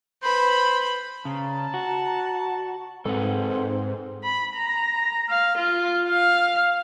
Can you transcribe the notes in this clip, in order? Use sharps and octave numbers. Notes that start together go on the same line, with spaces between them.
B4 C5 B5
C#3 D5 A5 A#5
F#4
G#2 C4 A4 B4 C5 F#5
B5
A#5
F5
F4
F5